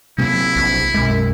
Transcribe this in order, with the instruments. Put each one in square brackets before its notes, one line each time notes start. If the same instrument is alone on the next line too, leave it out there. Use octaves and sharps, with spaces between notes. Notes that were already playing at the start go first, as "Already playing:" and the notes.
[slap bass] C3 F#3 A#3 [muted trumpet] E4
[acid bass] A#1
[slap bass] B1 G#3 [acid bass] F#2